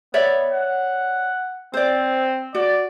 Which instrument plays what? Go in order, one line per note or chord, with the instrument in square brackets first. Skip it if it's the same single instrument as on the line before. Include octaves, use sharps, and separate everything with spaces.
[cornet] B3 [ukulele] C#5 D5 E5
[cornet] F#5
[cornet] C4 [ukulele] C5 D5
[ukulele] F#4 [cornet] D5